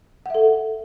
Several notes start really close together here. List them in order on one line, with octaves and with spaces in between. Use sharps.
F#5 E5 A4